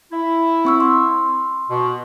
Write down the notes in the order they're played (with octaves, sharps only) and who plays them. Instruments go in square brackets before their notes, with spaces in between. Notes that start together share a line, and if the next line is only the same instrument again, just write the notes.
[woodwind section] E4
[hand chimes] C4 C#6 E6
C6
[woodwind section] B2